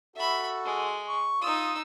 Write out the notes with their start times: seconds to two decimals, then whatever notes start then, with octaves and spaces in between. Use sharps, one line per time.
0.16 F#4 A4 E5 B5
0.65 G#3
1.08 C#6
1.42 D#4 F4 D#6 E6